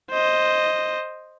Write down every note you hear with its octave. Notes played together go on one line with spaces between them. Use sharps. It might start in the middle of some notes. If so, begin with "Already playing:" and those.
C5 D#5